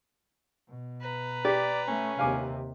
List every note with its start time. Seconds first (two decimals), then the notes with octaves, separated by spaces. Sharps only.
0.69 B2
1.01 B4 A#5
1.45 G4 D5
1.87 A3 C#4
2.19 D#2 C3 F5 G#5 D6